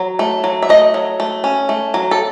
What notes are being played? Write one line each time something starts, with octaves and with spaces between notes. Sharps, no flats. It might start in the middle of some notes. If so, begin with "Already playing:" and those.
Already playing: F#3
A3
F#3
E5
A3 D#5
F#3
A3
C#4
A3
F#3
A4